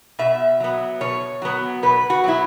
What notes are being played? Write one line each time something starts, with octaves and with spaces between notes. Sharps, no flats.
B2 E5
F#3 B3
B2 C#5
F#3 B3
B2 B4
F#4
F#3 B3 E4